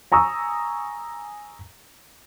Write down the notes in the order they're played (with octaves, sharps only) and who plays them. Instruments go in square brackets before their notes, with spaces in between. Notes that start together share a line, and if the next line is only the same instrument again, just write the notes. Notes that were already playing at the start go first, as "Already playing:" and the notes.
[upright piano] G#5 A#5 C#6 D#6 E6